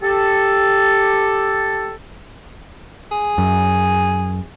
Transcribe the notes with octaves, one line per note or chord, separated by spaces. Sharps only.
G4 A4
G#4
F#2